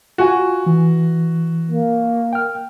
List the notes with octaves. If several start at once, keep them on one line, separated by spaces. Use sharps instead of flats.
F4 F#4 G#5
E3
A#3
G5 F6